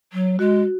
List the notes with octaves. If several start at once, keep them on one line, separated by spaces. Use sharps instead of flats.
F#3
G#3 F#4